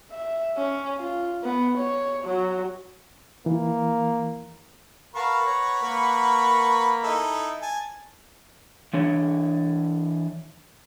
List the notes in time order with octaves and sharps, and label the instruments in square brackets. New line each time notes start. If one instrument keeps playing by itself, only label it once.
[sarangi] E5
C#4
F4
B3
C#5
F#3
[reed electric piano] E3 [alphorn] A#3
[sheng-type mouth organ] A#4 F5 A5 [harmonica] B4 F#5 C#6
[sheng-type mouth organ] C#5 A#5
A#3 A#4 B5
[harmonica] D#4 E4 A4
G#5 A5
[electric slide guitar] E3 D4 C#5